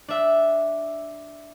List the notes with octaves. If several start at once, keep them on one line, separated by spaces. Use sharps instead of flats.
D4 E5